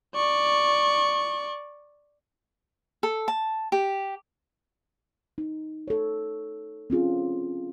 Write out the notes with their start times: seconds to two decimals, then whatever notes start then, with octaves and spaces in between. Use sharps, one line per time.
0.16 D5 C#6
3.03 A4
3.28 A5
3.72 G4
5.38 D#4
5.88 A4 C#5
6.90 C4 C#4 F4 G#4